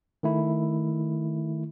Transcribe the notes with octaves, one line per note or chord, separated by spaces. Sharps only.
D#3 A3 E4